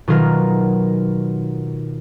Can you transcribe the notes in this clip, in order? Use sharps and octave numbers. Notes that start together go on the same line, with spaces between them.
B2 D#3 F#3 F4 A#4